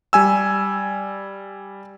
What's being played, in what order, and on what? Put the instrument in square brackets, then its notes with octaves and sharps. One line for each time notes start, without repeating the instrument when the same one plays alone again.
[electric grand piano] G3 G#5 E6